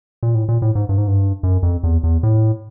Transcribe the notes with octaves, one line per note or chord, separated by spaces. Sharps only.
A#2
A2
A#2
A2
G#2
G2
G#2
G2
F#2
F2
E2
E2
A2